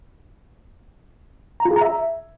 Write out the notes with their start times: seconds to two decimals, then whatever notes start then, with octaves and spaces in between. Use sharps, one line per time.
1.60 A#5
1.65 F4
1.71 G#4
1.76 A#5
1.81 E5